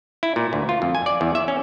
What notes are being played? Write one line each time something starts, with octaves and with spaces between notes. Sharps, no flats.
E4
A#2
D2
F4
F2
G#5
D5
E2
E5
C#4